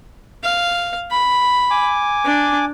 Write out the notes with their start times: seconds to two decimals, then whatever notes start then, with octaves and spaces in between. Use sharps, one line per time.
0.44 F5
1.11 B5
1.71 G#5 D6
2.25 D4